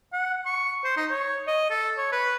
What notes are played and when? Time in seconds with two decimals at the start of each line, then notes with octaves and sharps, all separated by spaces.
0.13 F#5
0.46 C#6
0.84 C5
0.97 D#4
1.10 C#5
1.47 D#5
1.70 A4
1.98 C#5
2.12 B4